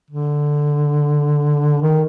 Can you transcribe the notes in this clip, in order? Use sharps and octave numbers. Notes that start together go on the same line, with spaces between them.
D3
D#3